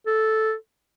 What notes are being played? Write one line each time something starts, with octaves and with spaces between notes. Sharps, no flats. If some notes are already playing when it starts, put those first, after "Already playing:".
A4